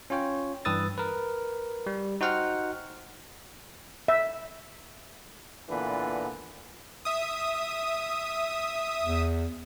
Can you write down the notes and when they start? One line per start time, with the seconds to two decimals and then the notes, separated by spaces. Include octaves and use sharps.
0.10 C#4 F4 C#5 G5
0.65 G2 E3 B4 D#6 E6 A6
0.98 A#4 B4
1.87 G3
2.21 D#4 F#4 C5 F#5 G5 F6
4.08 E5
5.69 A#2 D3 E3 B3 B4
7.05 E5 D#6
9.03 E2